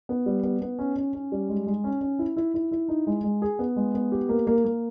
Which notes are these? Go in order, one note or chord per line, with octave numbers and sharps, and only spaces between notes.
B3
G3
B3
B3
C#4
C#4
C#4
G3
G#3
G#3
C#4
C#4
E4
E4
E4
E4
D#4
G#3
G#3
G#4
B3
G#3
B3
G4
A#3
A#3
A#3